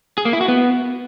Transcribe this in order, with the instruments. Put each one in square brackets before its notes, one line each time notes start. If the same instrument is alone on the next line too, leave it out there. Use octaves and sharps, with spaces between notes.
[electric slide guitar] G#4
A#3
E4
F#4
B3